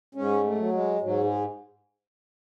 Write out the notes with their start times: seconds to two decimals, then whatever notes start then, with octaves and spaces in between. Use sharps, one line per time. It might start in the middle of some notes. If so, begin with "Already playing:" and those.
0.15 G#2 C#4
0.44 A3
0.58 F#3
0.73 G#3
1.01 G#2 F#3
1.24 G#3